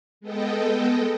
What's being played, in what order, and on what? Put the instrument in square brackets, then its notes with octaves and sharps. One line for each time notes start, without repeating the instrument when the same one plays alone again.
[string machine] G#3 B3 A4 D#5 G5